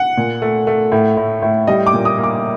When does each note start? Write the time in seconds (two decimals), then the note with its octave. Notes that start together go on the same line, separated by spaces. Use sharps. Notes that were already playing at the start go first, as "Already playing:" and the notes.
Already playing: F#5
0.17 A#2
0.42 A3
0.67 A3
0.92 A2
1.17 A2
1.42 A2
1.67 G3 D#5
1.87 D6
1.93 A#2
2.05 D#6
2.18 A#3
2.24 D6